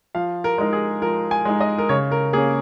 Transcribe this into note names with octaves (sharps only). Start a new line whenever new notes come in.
F3 F5
A#4
G#3 D#4 A#4
G#4
F3 A#4
G#5
G#3 D#4
D#5
A#4
C#3 C#5
A#4
A#3 C#4 G#4